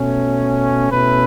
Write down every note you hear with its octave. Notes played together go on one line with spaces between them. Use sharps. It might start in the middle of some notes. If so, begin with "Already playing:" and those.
Already playing: B2 A3 C#4
B2 A3 C#4 E4 B4